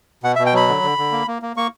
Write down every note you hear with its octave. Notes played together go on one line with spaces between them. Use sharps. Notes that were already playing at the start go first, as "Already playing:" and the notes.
B2 F#5
E5
B2
G5
F#3 B5
D3
D3
D3
A#3
A#3
A#3
A#3 C#6